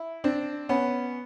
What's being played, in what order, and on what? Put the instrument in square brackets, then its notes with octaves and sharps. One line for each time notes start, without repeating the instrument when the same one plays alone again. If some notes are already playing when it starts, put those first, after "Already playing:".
Already playing: [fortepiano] E4
C4 D4
B3 C#4